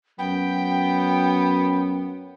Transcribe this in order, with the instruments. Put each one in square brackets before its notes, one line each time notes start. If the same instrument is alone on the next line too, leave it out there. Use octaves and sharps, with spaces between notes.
[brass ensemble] F#2 F#3 [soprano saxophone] B3 [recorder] G5